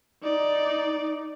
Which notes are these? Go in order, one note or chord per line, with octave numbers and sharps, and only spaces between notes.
D#4 D5